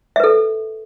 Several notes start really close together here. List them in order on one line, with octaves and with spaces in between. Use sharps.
E5 B4 A4